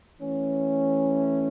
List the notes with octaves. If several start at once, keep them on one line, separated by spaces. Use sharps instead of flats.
E3 A3 C#4